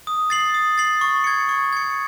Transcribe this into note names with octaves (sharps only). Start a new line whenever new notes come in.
D#6
A6 C7 F#7
D#6
A6 C7 F#7
C#6
G#6 C#7
C#6
G#6 C#7